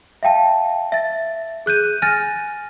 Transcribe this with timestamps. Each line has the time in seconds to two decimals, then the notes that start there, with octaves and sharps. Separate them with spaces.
0.23 E5 F5 G5 A5
0.92 E5 A6
1.66 G#4 F#6 G6 D#7
2.02 G#5 F6 A6 A#6 D#7